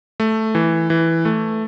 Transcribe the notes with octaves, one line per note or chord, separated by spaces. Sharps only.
A3
E3
E3
A3